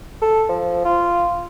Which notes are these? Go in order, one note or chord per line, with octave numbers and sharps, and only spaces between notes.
A4
F3
F4